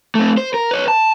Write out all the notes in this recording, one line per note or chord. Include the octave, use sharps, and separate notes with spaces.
A3 C4
C5
A#4
B4 C#5
A5